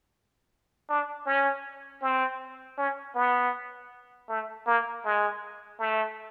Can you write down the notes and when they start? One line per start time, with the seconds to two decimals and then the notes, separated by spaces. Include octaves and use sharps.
0.89 D4
1.26 C#4
2.02 C4
2.78 C#4
3.15 B3
4.29 A3
4.67 A#3
5.04 G#3
5.79 A3